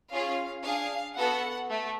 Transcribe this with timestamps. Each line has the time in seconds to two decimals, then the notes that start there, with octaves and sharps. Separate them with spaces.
0.12 C#4 F4 G#4 F5
0.64 D4 G#4 F5
1.17 B3 F#4 A4 F#5
1.69 A3